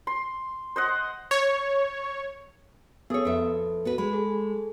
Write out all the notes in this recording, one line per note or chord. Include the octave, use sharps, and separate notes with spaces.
C6
C5 D#5 F#5
C#5
B3 G#4 A4 C#5 D#6
F2 A4 B4 E5
B3 F#4 B4
G#3 B5
G#4 A4